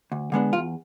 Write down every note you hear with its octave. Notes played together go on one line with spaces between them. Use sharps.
D2
D3 G#3 B3 D4
E2 F4